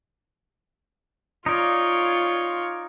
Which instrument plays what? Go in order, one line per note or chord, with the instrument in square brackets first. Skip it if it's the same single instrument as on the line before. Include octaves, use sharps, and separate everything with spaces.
[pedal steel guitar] D#4 D5 [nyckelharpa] F4 C#5